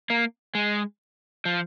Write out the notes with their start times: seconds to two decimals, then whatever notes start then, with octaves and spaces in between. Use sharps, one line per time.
0.10 A#3
0.55 G#3
1.45 F3